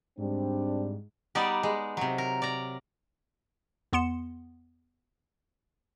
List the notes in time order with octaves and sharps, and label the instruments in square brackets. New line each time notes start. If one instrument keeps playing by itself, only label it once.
[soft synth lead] G#2 [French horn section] G3 C4 D4
[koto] G3 B3 D#4 D5
G#3
C3 F#3
A#4
D5 A#5
[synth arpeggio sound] E2 B3 C6 C#7 E7